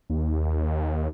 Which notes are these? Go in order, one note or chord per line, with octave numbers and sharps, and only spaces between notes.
D#2